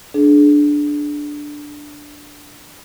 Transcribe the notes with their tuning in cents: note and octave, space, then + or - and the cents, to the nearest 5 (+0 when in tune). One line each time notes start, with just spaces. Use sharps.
D4 +0 G#4 +35